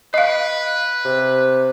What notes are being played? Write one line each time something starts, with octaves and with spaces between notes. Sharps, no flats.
B4 D#5 F5
C3